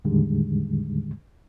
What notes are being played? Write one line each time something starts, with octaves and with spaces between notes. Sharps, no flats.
E2 A2 D3 D#3 G3 G#3